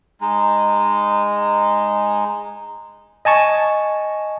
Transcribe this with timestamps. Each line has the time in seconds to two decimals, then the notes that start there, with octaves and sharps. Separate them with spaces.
0.21 G#3 D#4
3.25 D#5 G#5 A5 C#6